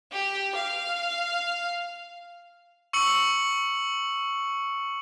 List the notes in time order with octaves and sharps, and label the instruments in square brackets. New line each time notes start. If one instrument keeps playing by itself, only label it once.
[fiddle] G4
F5
[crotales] C#6 E6 C#7 F#7